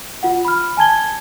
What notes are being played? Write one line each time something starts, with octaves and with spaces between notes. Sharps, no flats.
F4 F#5
B5 F6
G#5 A5 G#6 G7